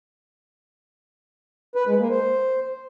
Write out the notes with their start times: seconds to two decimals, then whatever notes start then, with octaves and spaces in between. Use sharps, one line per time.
1.75 B4
1.87 G#3
1.99 A#3
2.10 C5